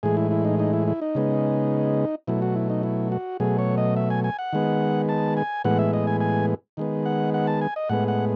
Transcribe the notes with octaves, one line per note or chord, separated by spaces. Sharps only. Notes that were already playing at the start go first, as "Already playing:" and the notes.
A2 E3 G#3 G#4
E4
E4
D#4
D#4
E4
E4
D#4
C#3 G#3 B3
B2 F#3 A3 E4
F#4
E4
D#4
E4
F#4
B2 F#3 A3 G#4
C#5
D#5
E5
G#5
G#5
F#5
D#3 G#3 B3
A5
G#5
A2 E3 G#3 B3 F#5
E5
D#5
G#5
G#5
D#3 G#3 B3
F#5
F#5
A5
G#5
D#5
A2 G#3 B3 F#5
F#5